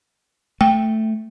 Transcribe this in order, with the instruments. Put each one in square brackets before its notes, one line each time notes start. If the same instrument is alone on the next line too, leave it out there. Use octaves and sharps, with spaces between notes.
[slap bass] A3 [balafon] G5